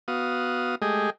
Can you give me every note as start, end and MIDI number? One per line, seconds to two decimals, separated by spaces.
0.08 0.75 59
0.08 0.75 66
0.08 0.75 77
0.08 0.75 87
0.82 1.10 56
0.82 1.10 57
0.82 1.10 67
0.82 1.10 68
0.82 1.10 75